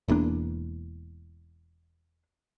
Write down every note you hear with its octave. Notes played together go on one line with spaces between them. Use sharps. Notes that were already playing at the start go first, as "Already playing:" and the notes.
E1 E2 A#3 D4